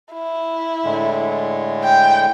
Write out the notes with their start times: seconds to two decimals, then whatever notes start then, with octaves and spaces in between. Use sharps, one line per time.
0.14 E4
0.85 A2 D3 G#3
1.84 G5